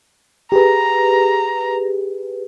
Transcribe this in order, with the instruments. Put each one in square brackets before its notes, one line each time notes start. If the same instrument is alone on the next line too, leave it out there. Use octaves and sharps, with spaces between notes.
[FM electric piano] G4 G#4 B4 [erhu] A#5